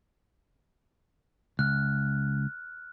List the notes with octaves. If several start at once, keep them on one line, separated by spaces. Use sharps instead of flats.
C#2 F6 F#6